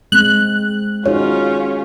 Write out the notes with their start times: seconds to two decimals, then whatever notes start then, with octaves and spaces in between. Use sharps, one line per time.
0.12 G#3 C4 F#6
1.06 C#4 D#4 F4 F#4 G#4 C#5